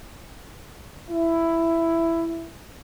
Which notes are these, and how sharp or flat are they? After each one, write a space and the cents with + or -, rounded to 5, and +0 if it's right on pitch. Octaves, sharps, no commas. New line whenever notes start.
E4 +10